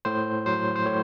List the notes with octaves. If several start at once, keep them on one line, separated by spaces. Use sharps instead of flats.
A2 C5
F#3 C5
C5
A2 C#5